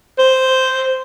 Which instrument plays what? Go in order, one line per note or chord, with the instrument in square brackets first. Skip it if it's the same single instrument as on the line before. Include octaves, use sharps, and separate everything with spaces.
[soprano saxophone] C5